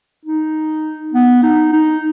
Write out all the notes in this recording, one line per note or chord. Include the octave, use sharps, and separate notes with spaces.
D#4
B3
D#4
D#4